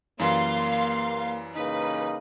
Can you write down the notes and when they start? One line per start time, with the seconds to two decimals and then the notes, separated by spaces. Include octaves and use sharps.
0.19 F#2 E3 G3 A#3 F5 C6
1.54 C#3 A#3 D#4 B4